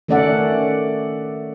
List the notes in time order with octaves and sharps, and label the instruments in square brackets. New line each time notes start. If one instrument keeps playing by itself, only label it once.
[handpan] D#3 A3 C#4 D5 E5 F#5